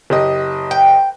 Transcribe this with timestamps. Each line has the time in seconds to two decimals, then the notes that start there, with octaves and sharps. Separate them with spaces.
0.10 F#1 G4 D#5
0.71 G5